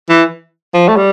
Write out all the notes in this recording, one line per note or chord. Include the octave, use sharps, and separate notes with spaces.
E3
F3
A3
G3